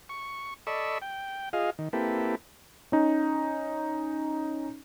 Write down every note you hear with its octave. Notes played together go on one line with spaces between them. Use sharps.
C#6
A4 D5 D#5 B5 C#6 E6
G5
F4 G#4 D#5 F5
D#3
A#3 C4 E4 G4 A4 B4
C#4 D#4